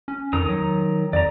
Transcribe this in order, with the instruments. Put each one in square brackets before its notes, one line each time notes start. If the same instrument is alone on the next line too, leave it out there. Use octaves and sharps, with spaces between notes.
[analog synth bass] C#4
[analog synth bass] F2 [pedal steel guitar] D#3 A#5 D#6
[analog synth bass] F#3
[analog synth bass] F2 [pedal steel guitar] D5 A#5